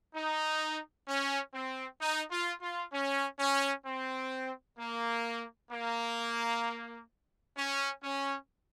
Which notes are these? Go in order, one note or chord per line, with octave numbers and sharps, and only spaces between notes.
D#4
C#4
C4
D#4
F4
F4
C#4
C#4
C4
A#3
A#3
C#4
C#4